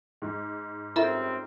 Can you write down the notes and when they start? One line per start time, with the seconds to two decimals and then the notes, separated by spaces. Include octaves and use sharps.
0.22 G#2
0.96 F#2 G3 C4 F4 A4 A#4 E5